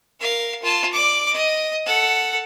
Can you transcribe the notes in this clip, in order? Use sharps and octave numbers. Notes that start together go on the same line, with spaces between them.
A#4 F5
F4 A5
D5 D6
D#5
A4 F#5